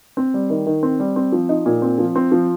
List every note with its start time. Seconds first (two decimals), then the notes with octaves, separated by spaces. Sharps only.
0.17 C4
0.34 G3
0.50 D#3
0.67 D#3
0.83 C4
1.00 G3
1.16 C4
1.32 F3
1.49 D#4
1.66 A#2
1.82 C4
1.98 F3
2.16 C4
2.32 F3